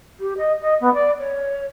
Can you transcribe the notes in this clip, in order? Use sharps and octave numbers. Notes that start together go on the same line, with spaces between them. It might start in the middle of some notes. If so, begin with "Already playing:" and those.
G4
D#5
D#5
B3
D5
C#5